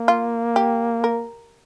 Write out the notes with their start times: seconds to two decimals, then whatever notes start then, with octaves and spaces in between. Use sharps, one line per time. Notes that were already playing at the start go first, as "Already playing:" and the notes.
Already playing: A#3
0.08 F4
0.56 G4
1.04 A#4